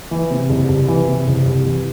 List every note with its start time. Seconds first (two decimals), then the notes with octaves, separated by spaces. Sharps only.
0.11 E3
0.30 C3
0.50 C2
0.69 C2
0.88 E3
1.08 C3
1.27 C2
1.46 C2
1.65 E3